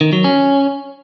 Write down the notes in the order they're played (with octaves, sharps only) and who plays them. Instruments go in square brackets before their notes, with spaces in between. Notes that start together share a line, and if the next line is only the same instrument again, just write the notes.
[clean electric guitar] D#3
F#3
C#4